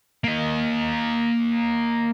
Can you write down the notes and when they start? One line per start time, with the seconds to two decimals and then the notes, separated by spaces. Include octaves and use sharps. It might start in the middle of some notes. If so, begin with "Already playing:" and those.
0.24 A#3 D#5